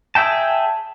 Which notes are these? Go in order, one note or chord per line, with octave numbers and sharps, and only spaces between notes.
G#4 E5 G5 A5